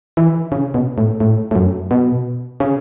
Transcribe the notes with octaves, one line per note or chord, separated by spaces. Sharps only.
E3
C#3
B2
A2
A2
A2
F#2
B2
C#3